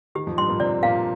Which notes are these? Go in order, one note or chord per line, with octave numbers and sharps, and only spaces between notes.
D#3 G4
F2 F3
G2 G3 C6
A#2 A#3
C3 C4 D5
A#2 A#3 F5